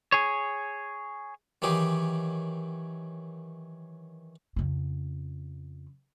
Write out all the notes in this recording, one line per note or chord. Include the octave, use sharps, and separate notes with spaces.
G#4 C#5
D#3 E3 F#3 G4 G#4
F2 C#3